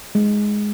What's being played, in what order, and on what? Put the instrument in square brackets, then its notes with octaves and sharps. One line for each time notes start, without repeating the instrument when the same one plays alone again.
[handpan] G#3